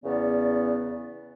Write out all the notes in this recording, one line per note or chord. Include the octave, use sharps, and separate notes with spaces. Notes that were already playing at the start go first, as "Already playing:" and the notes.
E2 C#3 B3 D5